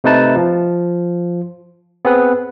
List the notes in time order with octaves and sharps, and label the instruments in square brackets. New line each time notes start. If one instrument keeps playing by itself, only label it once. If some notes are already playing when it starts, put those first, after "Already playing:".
[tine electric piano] C3 A3 D#4 B4 A5
F3
B3 C4 G#4 B4